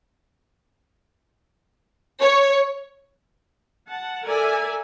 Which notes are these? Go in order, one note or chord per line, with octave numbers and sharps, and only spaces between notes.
C#5
F#5 A5
A4 A#4 D5 E5 G#5